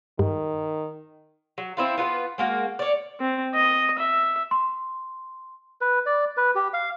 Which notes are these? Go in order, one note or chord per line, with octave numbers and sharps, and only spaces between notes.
G2 D#3
F#3
C4 E4 F4
B3 F4 A#4 B4
G#3 A#3 F#4
C#5 D5
C4
D#5
E5
C6
B4
D5
B4
G4
F5